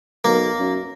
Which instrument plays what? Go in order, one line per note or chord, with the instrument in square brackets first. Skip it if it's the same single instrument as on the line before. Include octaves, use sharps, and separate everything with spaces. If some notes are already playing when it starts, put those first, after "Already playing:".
[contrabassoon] B1 [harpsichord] A#3
[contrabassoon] F#2